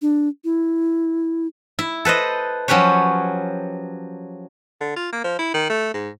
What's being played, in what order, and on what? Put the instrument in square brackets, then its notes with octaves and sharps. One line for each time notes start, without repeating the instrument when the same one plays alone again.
[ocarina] D4
E4
[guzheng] E4
A4 B4 C5 D#5
F3 F#3 C#4 G4 B4 C#5
[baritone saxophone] D3
F4
A#3
F3
E4
D#3
A3
G#2